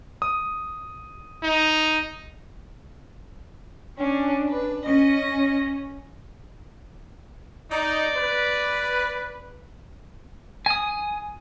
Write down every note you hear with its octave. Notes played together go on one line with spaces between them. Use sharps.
D#6
D#4
C#4 D4
B4
C#4 D#5
D#4 D5
B4
G#5 D#6